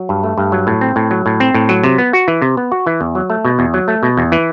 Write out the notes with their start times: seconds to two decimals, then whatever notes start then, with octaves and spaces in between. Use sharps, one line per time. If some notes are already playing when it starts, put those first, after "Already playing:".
Already playing: F#3
0.09 G2
0.23 A3
0.38 G2
0.52 F#3
0.67 A2
0.81 C4
0.96 A2
1.11 F#3
1.26 A2
1.40 C4
1.54 A2
1.69 F#3
1.84 C3
1.98 B3
2.13 F#4
2.28 E3
2.42 C3
2.57 B3
2.72 F#4
2.86 E3
3.01 E2
3.15 F#3
3.30 A3
3.45 B2
3.59 E2
3.74 F#3
3.88 A3
4.03 B2
4.17 E2
4.32 E3